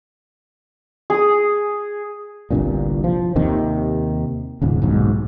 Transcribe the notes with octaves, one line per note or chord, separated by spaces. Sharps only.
G#4 D#6
G1 C2 G2 A#2
F3
D#2 C3 D#3
D#1 C#2 G#2
D#1 B1 G#2